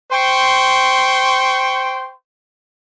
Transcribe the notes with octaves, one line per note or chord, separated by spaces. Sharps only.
C5 G5 C6 C#6